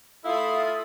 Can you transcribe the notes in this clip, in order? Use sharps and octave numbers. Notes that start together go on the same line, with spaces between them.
A3 E4 F4 F5 B5 D#6 F6